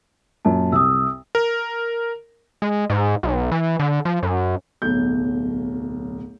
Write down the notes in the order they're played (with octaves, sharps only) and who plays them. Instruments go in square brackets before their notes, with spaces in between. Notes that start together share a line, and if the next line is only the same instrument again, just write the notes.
[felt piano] F#2 A#2 [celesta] A5
[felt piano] C2 [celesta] D#6 E6
[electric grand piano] A#4
[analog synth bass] G#3
G#2
B1
E3
D3
F3
F#2
[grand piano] D1 B1 B2 G6